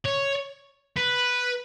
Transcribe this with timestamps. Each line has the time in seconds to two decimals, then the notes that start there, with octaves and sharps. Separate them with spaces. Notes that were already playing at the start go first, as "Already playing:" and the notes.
0.06 C#5
0.96 B4